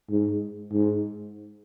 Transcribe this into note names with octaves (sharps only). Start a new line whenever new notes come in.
G#2
G#2